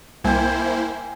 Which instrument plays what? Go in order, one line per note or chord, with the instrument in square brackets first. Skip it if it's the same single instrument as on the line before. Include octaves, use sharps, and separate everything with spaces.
[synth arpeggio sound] C2 [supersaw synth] A#3 E4 C5 [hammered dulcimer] G5 G#5